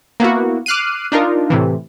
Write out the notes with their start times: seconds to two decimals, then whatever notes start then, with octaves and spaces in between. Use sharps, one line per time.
0.20 A#3 B3 E4 F#4
0.66 D6 F6 F#6 C7 D#7
1.12 D4 D#4 F4 A#4
1.50 A2 C3 E3